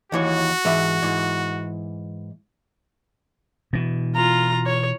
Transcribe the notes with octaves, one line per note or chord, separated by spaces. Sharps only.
D#2 E3 F#4 C#5
G#2 E3 E5
G#2 E3
B2 E3
F4 A#5
C#5